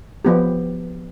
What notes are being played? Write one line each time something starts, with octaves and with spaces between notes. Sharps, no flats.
F3 B3 G4